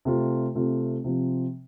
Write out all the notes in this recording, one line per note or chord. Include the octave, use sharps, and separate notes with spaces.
C3 A3 C4 F4
C3 A3 C4 F4
C3 F3 C4